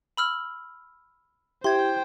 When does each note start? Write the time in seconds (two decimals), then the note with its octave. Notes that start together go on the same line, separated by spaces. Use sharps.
0.17 B5 E6 F6
1.64 E4 G4 C5 G5 C6 G#6